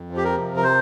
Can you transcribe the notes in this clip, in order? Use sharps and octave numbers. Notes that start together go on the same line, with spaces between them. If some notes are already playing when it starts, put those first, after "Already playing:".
Already playing: F2
F3
G4
A#4
C3
A#4
C5